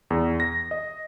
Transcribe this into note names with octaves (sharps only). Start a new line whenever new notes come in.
E2
A#6
D#5